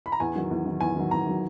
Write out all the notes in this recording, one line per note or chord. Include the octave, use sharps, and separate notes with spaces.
B5
A#5
E2 G#5
D#3 F#3
E2
D#3 F#3
E2 G#5
D#3 F#3
E2 A#5
D#3 F#3